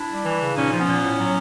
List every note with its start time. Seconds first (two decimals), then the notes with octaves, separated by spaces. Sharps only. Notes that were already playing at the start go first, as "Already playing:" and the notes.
Already playing: D4 E4
0.10 G3
0.25 E3
0.41 C#3
0.56 A#2 C#4 D#4
0.72 F3
0.79 B3 C#4
0.87 A#2
1.03 A2
1.18 F#3